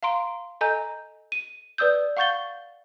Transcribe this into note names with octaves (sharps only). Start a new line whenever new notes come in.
F5 A#5 C6 D7
A4 D#5 G#5 A#5 G6
D#7
B4 D5 D#6 E6 G6
F5 F#5 C#6 G6 A6 G7